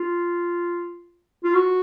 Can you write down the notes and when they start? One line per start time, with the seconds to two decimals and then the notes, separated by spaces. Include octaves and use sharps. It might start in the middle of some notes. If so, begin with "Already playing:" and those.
Already playing: F4
1.44 F4
1.54 F#4